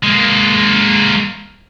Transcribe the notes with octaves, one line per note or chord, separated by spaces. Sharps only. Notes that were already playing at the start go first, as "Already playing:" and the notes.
G#3 A#3